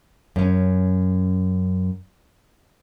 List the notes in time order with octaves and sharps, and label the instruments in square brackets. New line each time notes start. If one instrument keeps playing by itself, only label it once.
[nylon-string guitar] F#2 C#4